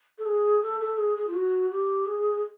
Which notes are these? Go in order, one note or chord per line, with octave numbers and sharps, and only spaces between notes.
A4
G#4
A4
A4
G#4
G#4
F4
F#4
G4
G#4